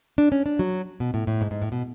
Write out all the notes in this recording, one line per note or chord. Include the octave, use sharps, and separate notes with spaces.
D4
C#4
D4
F#3
B2
A2
A2
G#2
G#2
A2
B2